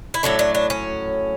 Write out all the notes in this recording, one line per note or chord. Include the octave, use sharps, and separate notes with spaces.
E4
A2 F#3 A3 D4
D4
D4
C#4